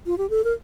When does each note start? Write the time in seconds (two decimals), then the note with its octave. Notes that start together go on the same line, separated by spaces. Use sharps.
0.06 F4
0.18 G4
0.30 A4
0.44 A#4